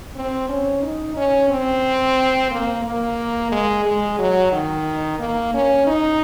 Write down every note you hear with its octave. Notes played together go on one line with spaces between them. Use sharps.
C4
C#4
D#4
C#4
C4
A#3
A#3
G#3
G#3
F#3
D#3
A#3
C#4
D#4